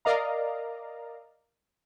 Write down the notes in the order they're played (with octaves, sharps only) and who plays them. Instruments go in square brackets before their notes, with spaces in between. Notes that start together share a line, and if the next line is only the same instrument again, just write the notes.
[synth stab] A#4 D5 D#5 F5 A#5